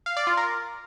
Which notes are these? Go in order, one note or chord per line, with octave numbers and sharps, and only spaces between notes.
F5
D5
F4
A#4